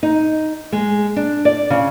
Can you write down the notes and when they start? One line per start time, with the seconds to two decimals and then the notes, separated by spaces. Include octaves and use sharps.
0.03 D#4
0.72 G#3
1.16 D4
1.45 D5
1.70 C#3